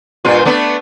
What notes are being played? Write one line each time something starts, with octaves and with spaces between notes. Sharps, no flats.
G2 A#2 F4
A3 B3 D4